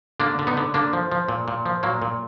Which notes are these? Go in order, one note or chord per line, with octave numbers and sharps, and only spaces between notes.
D3 A#3 D4
D3
B3 D#4
D3
D3 A#3 D4
F3
F3
A#2
A#2
F3
A#2 F#3 A#3
A#2